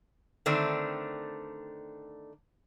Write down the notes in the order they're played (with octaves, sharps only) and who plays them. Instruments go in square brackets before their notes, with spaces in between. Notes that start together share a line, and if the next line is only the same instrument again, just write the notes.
[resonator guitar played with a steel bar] D3 D#3 A3 C4 D4